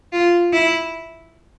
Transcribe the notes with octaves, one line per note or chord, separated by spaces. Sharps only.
F4
E4